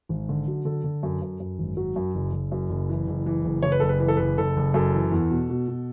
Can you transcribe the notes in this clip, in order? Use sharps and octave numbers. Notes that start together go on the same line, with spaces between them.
G#1
D3
F#3
D3 A4
D3
F#2
F#2
F#2
G#1
F#3
F#2
F#1
F#1
F#2
F#1
E3
F#1
E3
F#1
F#1 C#5
B4
F#1 A4
B4
E3 B4
A4
F#1 B4
F#1 A4
F#1
F#2 A4
E3
E2
B2
B2
B2